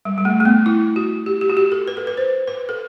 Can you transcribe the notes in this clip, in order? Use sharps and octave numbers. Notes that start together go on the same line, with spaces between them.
G3
G3
A3
A3
B3
E4
F#4
G4
G4
F#4
G4
A4
B4
A4
B4
C5
B4
A4